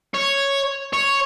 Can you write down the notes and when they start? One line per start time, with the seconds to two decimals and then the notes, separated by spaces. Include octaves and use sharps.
0.14 C#5
0.93 C#5